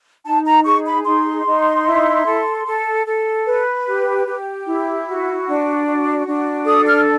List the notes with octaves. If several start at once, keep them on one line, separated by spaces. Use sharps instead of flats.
D#4 A5
A#5
G#4 C#6
B5
D#4 C6
D#4
E4
A4
A4
A4
B4
G4
G4
E4
F#4
D4
F#4
D4
A4 D#6
F6